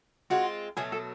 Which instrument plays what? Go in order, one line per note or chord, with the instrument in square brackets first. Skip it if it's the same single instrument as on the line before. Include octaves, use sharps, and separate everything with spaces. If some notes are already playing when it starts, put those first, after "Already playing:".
[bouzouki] G#3 C4 F4 [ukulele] F#4
[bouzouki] B2 F#3 A3 [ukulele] G#4
[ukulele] A4